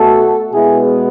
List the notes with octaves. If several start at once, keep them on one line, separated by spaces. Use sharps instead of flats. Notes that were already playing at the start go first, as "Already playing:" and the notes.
Already playing: B2 A3 F#4 A4
B2 G#3 B3 E4 G#4